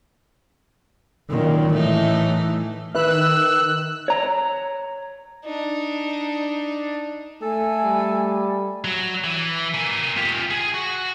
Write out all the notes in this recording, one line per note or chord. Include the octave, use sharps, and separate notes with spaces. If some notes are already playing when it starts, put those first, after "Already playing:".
F#2 A#2 D#3
A2 E3 A3 D#4
D#3 B4 E5 E6 F#6
C#5 A#5
D4 D#4
A3 A4 G#5
G3
F#3
E3
A#3 G#5
F4 G4
G#4 G#5
F#4